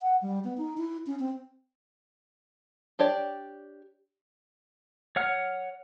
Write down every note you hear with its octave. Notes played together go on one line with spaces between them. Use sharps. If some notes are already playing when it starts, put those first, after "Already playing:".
F#5
G3
B3
D#4
E4
C#4
C4
D4 G4 C#5 D5
C#5 F#5 F6